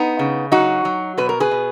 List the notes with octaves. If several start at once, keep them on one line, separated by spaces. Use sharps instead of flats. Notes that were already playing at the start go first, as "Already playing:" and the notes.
Already playing: B3 D#4
C#3
F#3 D#4 F#4
F#3
B2 B4
A#4
G#4 B4
B2